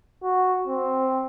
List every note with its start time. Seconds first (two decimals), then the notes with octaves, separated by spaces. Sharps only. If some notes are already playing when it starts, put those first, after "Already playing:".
0.23 F#4
0.67 C4